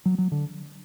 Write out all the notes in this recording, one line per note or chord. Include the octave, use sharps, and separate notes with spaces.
F#3
F#3
D3